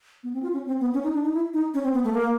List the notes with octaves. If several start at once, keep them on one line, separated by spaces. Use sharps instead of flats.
B3
C4
F4
C#4
C4
B3
C#4
D#4
D4
D#4
E4
D#4
C#4
C4
B3
A3
A#3